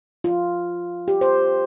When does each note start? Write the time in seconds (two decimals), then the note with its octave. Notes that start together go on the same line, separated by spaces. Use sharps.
0.24 F4
1.08 G4
1.21 C5